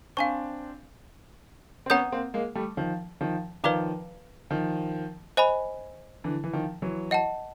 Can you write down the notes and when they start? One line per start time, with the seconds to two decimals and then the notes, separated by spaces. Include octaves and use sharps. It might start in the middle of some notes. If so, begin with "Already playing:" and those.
0.17 C4 D4 F5 G#5 C#6
1.86 C4
1.90 B3 C#4 F#5 A#5 D#6 G6
2.12 A#3 C4
2.34 G#3 A#3
2.55 G3 A3
2.77 D#3 F3
3.21 D#3 F3
3.63 D#3 F3 B4 D5 F5 A#5 D6
4.50 D#3 F3
5.37 C5 D#5 G#5 B5
6.24 D3 E3
6.44 E3
6.53 D#3 F3
6.82 E3 F#3
7.11 D#5 F#5 A5